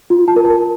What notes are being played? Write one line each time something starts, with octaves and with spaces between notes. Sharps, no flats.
F4
A5
A#4
A5